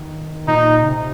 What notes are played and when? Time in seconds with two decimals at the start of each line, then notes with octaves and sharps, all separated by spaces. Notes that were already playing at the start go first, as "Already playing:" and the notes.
Already playing: D#3
0.48 A#2 D#4
0.82 C#3
0.88 C3